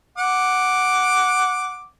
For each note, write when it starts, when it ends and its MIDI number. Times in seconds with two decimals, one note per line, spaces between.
0.18 1.85 78
0.18 1.85 86